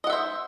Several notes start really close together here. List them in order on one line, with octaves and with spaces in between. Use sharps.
D#5 F#5 E5 C5